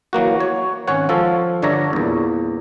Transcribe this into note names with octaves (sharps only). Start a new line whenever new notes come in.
E3 F#3 A#3 F#4
C#5
G#1 C#4 C#5 F#5
F3 A4 F5
G2 D3 D4 C#5 E5 A#5
E2 A#2